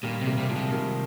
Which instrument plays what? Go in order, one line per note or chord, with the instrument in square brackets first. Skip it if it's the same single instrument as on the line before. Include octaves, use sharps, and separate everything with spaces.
[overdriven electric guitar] A#2 [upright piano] D#3 G3
[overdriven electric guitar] C3
[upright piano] G3 A#3
[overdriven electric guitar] C3 [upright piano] A#3
[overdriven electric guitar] A#2 [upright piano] F3 G#3
[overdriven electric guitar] C3
[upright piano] D#3 G3